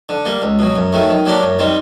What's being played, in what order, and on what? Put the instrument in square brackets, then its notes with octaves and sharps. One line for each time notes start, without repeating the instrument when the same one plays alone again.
[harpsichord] D3
G3 A#3
C#2
B2 F#3
F#2
D#3 F#3 A3
D#3
F#3 A#3 D4 G4
F#2
D#3 G3 C4